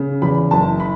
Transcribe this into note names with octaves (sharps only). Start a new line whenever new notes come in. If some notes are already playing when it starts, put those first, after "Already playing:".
Already playing: C#3
E2 B5
F#1 A5
B5